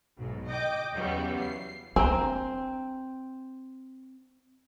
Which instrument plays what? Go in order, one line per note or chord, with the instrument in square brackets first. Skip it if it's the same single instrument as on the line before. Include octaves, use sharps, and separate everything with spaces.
[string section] B1 G#2
D#5 G5 D6
E2 C#3 E3 F#3 G3 B3
C7
[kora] C4 [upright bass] D4 [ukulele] G5 A#5 [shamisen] G#5